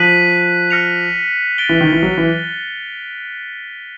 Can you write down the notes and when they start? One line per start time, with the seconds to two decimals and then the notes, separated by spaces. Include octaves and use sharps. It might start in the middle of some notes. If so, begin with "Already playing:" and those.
Already playing: F3 F#6 B6 D#7 F#7
0.71 F6 A#6 C#7 F7
1.58 A6 D7 G7
1.69 E3
1.81 D#3
1.92 E3
2.03 F#3
2.18 E3